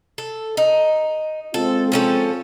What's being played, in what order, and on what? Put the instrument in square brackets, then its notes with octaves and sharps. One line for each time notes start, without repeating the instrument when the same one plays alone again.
[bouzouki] A4
D#4
[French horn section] G#3 C4 F4 [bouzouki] A4
[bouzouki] F3 C#4 A4